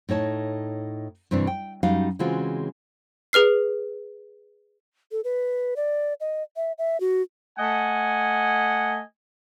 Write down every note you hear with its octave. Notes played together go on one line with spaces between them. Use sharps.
A2 D#4 C#5 A5
G2 C3 E3 C4 D4
G5
F#2 G3 D#4 F#4 F5
C#3 E3 G#3 C4 F4 F#4
G#4 B4 F6 C7
A4
B4
D5
D#5
E5
E5
F#4
A3 D#5 F#5 G#5